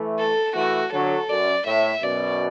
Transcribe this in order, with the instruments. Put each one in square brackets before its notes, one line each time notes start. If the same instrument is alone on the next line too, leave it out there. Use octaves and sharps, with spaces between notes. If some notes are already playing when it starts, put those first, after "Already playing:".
Already playing: [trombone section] E3 A3
[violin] A4
[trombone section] E3 A3 [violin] F#4
[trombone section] D3 F#3 [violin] A4
[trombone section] F#2 [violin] D5
[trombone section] A2 [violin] E5
[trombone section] F#2 B2 [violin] D5